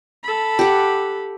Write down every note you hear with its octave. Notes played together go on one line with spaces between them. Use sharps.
A4 B5
G4 F#5